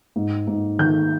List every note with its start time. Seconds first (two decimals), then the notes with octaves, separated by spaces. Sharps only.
0.16 G#2
0.47 G#2
0.79 D#3 G6